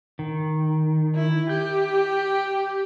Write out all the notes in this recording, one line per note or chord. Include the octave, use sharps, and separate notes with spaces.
D#3
E4
G4 G6